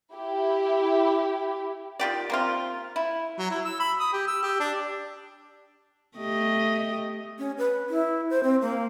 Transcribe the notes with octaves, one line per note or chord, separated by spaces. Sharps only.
E4 G4
D#3 F4 G4 D5
A#3 C4 F4
E4
F#3
E4
E6
B5
D#6
G4
E6
G4
D4
A3 G4 D#5
C#4
B4
E4
C5
C4
A#3